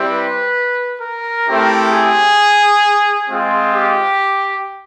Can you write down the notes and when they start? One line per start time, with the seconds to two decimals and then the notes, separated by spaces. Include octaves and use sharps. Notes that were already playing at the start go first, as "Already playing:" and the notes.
Already playing: G3 C4 E4 G4
0.11 B4
1.02 A#4
1.47 A3 C4 E4 G4
1.93 G#4
3.29 G#3 C4 F4
3.75 G4